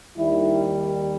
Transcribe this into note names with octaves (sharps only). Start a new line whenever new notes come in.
D#2 D#3 G3 E4